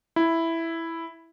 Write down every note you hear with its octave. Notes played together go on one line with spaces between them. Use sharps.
E4